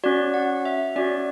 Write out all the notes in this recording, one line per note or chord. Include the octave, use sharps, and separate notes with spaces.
C#4 F#4 D5
F#5
E5
C#4 F#4 D5